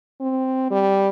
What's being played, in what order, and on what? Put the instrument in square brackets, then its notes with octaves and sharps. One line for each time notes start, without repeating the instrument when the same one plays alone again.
[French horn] C4
G3